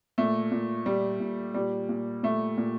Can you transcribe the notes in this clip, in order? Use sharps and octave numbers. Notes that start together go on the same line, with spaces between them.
A#2 A3
A#2
A#2 G3
A#2
A#2 G3
A#2
A#2 A3
A#2